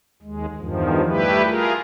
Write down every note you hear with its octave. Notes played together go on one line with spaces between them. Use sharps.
D#2 G#3
E2 G2 D#3 F3
G3 A3 E4 G4 B4
F4 G#4 A#4